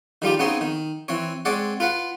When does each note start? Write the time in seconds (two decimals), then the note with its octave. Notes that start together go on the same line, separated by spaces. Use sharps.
0.22 D#3 G3 F4 G4
0.39 C#3 B3 C4 D#4 C#5 C6
0.61 D#3
1.08 E3 C4 C#5
1.45 G#3 C4 C#5 D5 F#5
1.80 F4 B4 F5 F#5